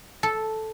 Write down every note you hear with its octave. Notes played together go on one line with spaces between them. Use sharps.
A4